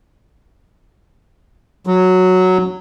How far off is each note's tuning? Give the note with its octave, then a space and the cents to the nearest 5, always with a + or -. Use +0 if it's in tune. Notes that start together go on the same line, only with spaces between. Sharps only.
F#3 -5